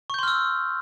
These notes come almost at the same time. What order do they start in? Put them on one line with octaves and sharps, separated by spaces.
C#6 G6 C6 F6 E6